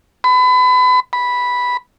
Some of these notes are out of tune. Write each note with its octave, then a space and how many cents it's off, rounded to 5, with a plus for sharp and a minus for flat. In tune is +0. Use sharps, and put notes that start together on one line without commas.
B5 +30
B5 -5